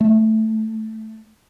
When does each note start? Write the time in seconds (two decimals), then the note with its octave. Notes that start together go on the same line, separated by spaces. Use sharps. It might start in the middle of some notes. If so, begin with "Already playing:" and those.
0.01 A3